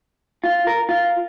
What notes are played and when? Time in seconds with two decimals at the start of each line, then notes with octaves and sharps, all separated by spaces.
0.44 F4
0.67 A#4
0.89 F4